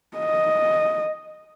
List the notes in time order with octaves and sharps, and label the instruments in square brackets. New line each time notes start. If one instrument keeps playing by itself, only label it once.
[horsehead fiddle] D#5